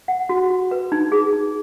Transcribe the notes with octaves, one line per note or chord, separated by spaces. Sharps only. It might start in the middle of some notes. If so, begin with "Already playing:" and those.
F#5
F#4
F#4
B4
D#4
G#4
D#4